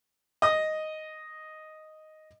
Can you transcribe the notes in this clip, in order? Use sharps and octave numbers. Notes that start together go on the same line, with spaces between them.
D#5 D#6